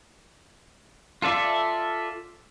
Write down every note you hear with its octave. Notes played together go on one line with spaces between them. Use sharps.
F4 A4 D5 E5